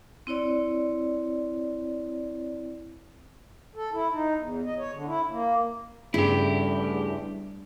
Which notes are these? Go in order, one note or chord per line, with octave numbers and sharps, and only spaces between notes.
C4 E4 C#5 D5
A4
E4
D#4
E2
D#5
C#5
D3
E4
A#3
E2 G2 C#3 A3 E4 G4